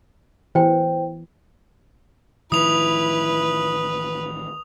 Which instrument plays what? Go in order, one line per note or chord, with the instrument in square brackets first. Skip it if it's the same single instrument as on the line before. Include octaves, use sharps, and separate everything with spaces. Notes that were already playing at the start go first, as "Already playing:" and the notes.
[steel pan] E3 [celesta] C5 G5
[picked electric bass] A1 D#3 F3 [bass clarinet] E4 [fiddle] B4 [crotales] D#6 F7